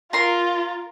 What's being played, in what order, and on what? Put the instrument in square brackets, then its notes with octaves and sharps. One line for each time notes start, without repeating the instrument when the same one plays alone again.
[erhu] F4 [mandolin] A#4 C6